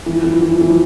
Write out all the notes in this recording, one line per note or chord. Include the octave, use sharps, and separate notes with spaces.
E3
F3
E3
F3
E3
F3
E3
F3